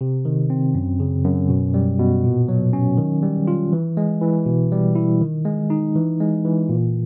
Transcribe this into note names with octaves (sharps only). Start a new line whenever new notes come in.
C3
D#3
C4
F#2
C#3
F#2
B2
G3
B2
A#2
F#3
C#4
D#3
G3
F4
E3
G#3
E3
B2
G3
E4
D#3
G#3
D#4
E3
G#3
E3
A#2